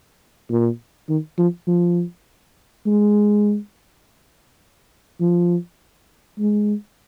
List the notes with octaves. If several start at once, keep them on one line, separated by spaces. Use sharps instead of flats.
A#2
D#3
F3
F3
G#3
F3
G#3